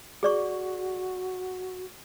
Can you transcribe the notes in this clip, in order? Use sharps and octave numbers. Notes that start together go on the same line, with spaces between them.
F#4 G#4 D5 C#6